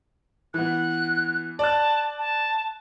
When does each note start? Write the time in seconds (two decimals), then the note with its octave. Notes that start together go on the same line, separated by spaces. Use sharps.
0.54 E3 B3 F#6
1.59 D5 A5 F#6
2.19 A5